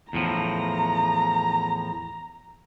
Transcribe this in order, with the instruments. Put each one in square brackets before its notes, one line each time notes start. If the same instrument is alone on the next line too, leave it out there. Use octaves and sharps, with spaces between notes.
[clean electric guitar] E2 A2 F3 [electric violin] A#5